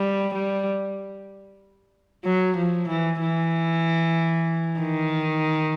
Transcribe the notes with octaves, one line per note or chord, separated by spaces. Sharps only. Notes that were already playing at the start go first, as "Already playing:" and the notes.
Already playing: G3
G3
F#3
F3
E3
E3
D#3